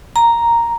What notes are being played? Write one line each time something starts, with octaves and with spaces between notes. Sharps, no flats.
A#5